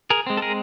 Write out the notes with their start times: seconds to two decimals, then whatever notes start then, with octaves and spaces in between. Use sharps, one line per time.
0.10 G#4 A#4
0.27 G#3 C4
0.37 A4
0.42 G#4 A#4